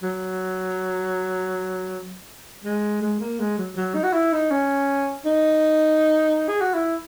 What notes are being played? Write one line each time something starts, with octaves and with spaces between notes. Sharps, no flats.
F#3
G#3
G#3
A#3
G#3
F#3
F#3
D#4
F#4
E4
D#4
C#4
D#4
G#4
F#4
E4